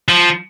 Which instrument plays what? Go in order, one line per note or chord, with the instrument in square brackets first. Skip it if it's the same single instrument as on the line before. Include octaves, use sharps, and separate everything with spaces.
[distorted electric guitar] F3